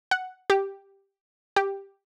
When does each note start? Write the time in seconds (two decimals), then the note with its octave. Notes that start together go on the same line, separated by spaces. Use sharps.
0.11 F#5
0.50 G4
1.56 G4